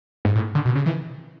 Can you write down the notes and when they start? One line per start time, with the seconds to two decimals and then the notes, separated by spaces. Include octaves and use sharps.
0.25 G#2
0.35 A2
0.55 D3
0.65 B2
0.75 C#3
0.86 E3